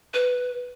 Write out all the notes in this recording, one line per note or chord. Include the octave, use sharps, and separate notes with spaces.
B4